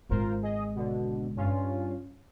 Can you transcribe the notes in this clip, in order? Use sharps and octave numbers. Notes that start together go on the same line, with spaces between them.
G#1 G#2 F4 A#4 C5
G#4 D#5
B2 D3
G2 C#4 F4